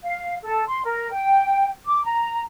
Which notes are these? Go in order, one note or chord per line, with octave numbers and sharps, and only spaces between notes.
F5
A4
C6
A#4
G5
D6
A#5